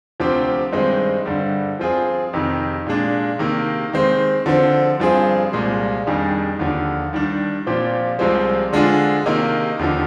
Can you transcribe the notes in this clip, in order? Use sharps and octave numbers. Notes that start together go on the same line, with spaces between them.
D2 C3 F3 C4 G4
G2 D#3 G#3 C4 D#4
G2 D3 G3
F3 C4 F4 G#4
F2 C3 D#3
A#2 G#3 D4
C3 D#3 A#3
D#3 G#3 C4
D3 F3 C4
G2 F3 C4 F4 G#4
C2 A#2 G#3
F2 D#3 G3 D4 G#4
D#2 D3 F3
D#3 G3 D4
A#2 F3 C4 G4
C2 C3 F3 G#3 C4
D3 G#3 D4 F4 G#4
C3 D#3 A#3 D#4
D#2 D3 F3